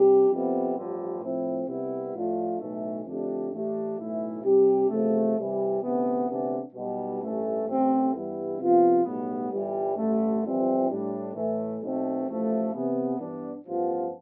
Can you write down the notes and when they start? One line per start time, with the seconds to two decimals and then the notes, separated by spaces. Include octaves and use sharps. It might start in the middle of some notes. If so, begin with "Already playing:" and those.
Already playing: C3 G3 D4 G4
0.29 F2 C3 G3 B3
0.75 A1 G2 D3 F3
1.21 A2 F3 C4 E4
1.67 C2 C3 G3 B3 E4
2.14 A2 F3 A3 D4 F4
2.59 B1 A2 E3 A3
3.06 F2 D3 A3 D4 G4
3.51 A2 E3 A3 D4 G4
3.98 B1 A2 E3 A3 E4
4.43 C3 G3 D4 G4
4.89 E2 C3 F3 A3
5.37 C2 C3 E3 G3
5.82 D2 C3 E3 B3
6.29 D2 C3 E3 B3 D4
6.74 B1 B2 G3
7.20 A1 G2 E3 A3
7.66 A1 G2 D3 A3 C4
8.13 G2 E3 G3 B3 E4
8.58 C3 F3 B3 F4
9.04 B1 A2 G3 B3
9.51 G1 G2 E3 G3
9.97 A1 G2 D3 A3
10.42 G1 F2 E3 G3 C4
10.89 A2 G3 D4
11.35 A2 E3 A3
11.81 B1 B2 A3 C4
12.27 A1 A2 F3 A3 E4
12.73 C3 E3 B3
13.19 G2 E3 B3 D4
13.66 A1 G2 F3 B3 F4